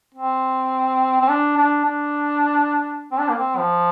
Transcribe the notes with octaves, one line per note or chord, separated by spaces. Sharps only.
C4
C4
D4
D4
D4
C4
D4
A#3
C4
F3